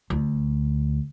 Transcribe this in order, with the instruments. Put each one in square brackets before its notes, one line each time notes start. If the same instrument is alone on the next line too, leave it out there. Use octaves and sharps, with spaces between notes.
[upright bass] D2